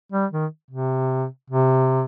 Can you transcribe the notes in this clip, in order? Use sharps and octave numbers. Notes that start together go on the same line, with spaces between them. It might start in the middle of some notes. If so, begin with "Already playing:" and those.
G3
D#3
C3
C3